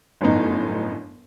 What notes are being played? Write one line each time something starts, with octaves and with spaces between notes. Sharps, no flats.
G1 F#2 A2 B3 D#4